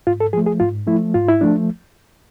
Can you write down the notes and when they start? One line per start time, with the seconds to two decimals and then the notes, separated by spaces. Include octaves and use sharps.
0.07 G#2 F4
0.20 A4
0.33 F3 A3 G#4
0.46 G#4
0.60 G#2 F4
0.87 F3 A3 E4
1.14 G#2 F4
1.29 E4
1.41 F3 A3 D4